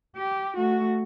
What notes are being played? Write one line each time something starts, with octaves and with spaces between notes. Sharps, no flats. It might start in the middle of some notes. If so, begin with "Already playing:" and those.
G4
A3 F#4